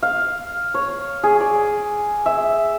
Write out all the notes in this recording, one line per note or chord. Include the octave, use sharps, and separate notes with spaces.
F5
C#5
G#4
D5
E5